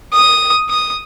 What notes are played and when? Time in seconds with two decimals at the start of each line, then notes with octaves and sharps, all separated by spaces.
0.13 D#6
0.69 D#6